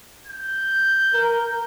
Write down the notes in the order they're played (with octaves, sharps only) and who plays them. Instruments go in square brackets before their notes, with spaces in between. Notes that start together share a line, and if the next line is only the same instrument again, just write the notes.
[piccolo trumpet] G6
[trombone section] A#4